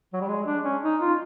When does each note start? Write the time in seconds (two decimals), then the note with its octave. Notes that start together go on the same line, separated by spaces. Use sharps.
0.13 F#3
0.20 G3
0.28 G#3
0.46 D4
0.63 C#4
0.83 D#4
1.00 F4